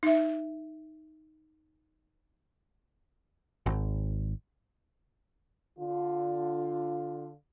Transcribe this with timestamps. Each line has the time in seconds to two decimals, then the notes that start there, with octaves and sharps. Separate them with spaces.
0.03 D#4 E5
3.66 G#1
5.79 D3 F4